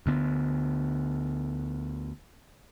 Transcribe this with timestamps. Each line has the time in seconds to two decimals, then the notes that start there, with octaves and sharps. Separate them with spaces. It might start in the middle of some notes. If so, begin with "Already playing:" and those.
0.06 D2 D3 B3